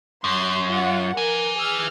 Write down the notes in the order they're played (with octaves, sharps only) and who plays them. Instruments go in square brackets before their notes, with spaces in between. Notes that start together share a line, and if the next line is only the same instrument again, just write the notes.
[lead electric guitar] F#2 [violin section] C6
[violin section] F4 F#5
[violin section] A#4 [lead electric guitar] B4 G#5
[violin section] G#4 E6 F6